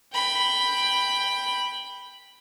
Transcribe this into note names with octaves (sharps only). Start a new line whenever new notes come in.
G5 B5